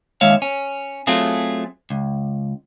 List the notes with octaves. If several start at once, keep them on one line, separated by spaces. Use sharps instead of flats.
D#2 G#3 C#5 E5 F5
C#4
F#3 A3 C4 F4 G#4
C#2